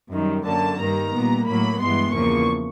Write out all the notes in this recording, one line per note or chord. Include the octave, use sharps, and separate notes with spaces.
F#2 D#3 G3
F#2 D3 F#3 A#3 A5
G2 D#3 G3 A#3 A#5
A#2 G3 B3
A2 F#3 A#3 B5
G2 E3 G#3 B3 C6
E2 C#3 F3 A#3 C#6